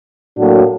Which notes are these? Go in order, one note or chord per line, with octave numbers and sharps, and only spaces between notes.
A2 F#3 A#3 D4 F#4